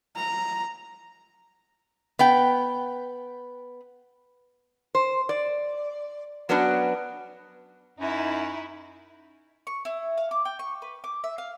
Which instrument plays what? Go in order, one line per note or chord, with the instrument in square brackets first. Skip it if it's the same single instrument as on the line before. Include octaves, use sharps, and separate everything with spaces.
[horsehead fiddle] A#5
[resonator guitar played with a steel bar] B3 B4 G5
C5
D5
F#3 B3 C#4 D4 F#4 B4
[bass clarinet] F#2 [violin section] D#4 E4
[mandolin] C#6
E4
F5
D6
G5
C#6
B4
D6
E5
F5